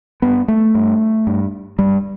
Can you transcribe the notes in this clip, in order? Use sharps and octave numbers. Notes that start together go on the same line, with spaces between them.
G2 B3
A3
G2
G2
G2 G3